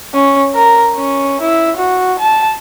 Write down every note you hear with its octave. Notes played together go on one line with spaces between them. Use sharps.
C#4
A#4
C#4
E4
F#4
A5